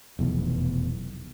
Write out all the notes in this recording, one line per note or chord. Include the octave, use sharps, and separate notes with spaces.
F1 B1 E2